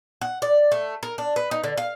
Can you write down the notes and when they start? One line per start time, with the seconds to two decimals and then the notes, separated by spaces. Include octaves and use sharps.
0.21 F#5
0.42 D5
0.72 A3
1.03 A#4
1.18 D4
1.36 B4
1.51 D#4
1.64 D3
1.77 F5